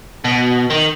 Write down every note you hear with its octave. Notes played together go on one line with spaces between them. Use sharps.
B2
D#3